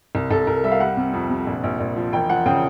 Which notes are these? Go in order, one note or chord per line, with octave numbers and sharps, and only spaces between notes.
C2
C2 A4
C2 A#4
G3 E5
F5
G3 F#5
C3
F2
C3
A#1
A#1
A#1
F3
E1 G5
F3 F#5
C#3 G5